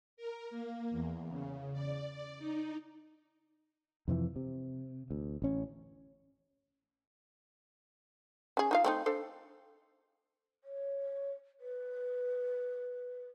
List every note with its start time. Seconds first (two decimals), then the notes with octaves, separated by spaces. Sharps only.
0.17 A#4
0.50 A#3
0.91 E2
1.29 C#3
1.73 D5
2.11 D5
2.39 D#4
4.08 F2 C3 E3 F3
4.36 C3
5.11 D2
5.42 A1 C#4
8.57 C#4 G#4
8.71 D#4 F4 F5
8.84 A3 C4 D#4
9.06 D4 A4 C5
10.64 C#5
11.60 B4